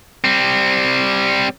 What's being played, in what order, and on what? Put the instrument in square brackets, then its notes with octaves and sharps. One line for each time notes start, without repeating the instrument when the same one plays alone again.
[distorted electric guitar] G3 C4